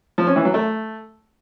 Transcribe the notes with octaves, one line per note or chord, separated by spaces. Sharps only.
F3
C#4
E3
F#3
A3